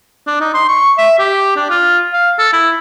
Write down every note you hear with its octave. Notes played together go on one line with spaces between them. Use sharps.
D4
D#4
C6
C#6
E5
G4
D4
F4
F5
A4
E4